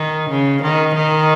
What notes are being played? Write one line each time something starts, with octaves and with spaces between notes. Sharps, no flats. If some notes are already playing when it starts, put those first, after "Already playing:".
Already playing: D#3
C#3
D#3
D#3